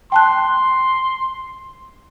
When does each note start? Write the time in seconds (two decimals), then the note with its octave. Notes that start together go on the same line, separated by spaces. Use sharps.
0.12 G5 A5 C6 F#6